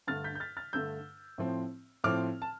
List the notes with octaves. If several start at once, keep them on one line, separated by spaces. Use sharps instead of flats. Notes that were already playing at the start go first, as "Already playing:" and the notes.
G2 D3 A3 F6 A6
G6 B6
G6
F6 A6
F6 A6
G2 D3 A3 E6 G6
A2 F3 C4
A2 F3 C4 D6 F6
A5